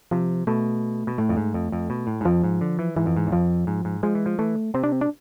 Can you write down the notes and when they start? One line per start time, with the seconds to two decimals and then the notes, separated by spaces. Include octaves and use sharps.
0.11 C3 F3
0.47 B2 A3
1.07 B2
1.18 A2 A3
1.29 F2
1.37 G#2
1.54 F2
1.72 F2
1.90 B2
2.07 A2
2.21 G#2
2.25 F2 F3
2.44 G#2
2.61 D3
2.79 E3
2.97 G#2 E3
3.06 F2
3.16 G#2
3.27 E2
3.32 F2 F3
3.67 G#2
3.85 G#2
4.03 F3 G#3
4.15 E3
4.26 F3
4.39 E3 A3
4.74 C3 C4
4.84 D4
4.92 C4
5.01 D4